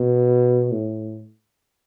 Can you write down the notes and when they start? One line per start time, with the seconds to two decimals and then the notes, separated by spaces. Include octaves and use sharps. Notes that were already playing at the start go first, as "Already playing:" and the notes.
Already playing: B2
0.72 A2